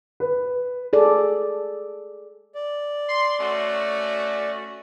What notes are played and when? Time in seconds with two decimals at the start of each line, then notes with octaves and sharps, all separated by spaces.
0.20 B4
0.93 G#4 A4 D5
2.55 D5
3.09 C6
3.40 A3 C#4 F#4